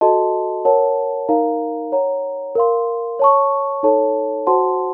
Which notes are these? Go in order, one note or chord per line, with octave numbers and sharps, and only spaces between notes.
F#4 A4 D#5 A5 C6
A#4 C#5 F#5 A5
D#4 A#4 F5 A#5
C#5 F#5 A#5
A#4 F5 C6
C#5 A5 C#6
D#4 A4 C#5 A5
F#4 C5 F#5 A5 C6